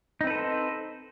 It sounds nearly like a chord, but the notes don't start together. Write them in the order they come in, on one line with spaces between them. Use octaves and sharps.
D#4 C4 B4 A4 C5